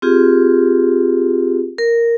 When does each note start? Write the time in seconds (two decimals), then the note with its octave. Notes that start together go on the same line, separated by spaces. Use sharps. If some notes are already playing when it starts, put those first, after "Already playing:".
0.02 C4 F4 G4 G#4
1.78 A#4